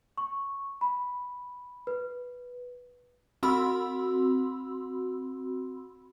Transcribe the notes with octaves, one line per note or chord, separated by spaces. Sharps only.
C#6
B5
B4
C4 F#4 B5 C6 E6